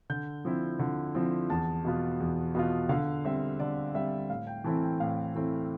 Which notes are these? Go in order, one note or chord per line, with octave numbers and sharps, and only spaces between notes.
D3 G6
F3 C4 E4
D3
F3 C4 E4
E2 A5
B2 B3 F4
E2
B2 B3 F4
D3 F5
G3 C4 E5
D3 D5
G3 C4 E5
A2 F5
G5
E3 A3 C4 E4 A5
G5
A2 F5
E3 A3 C4 E4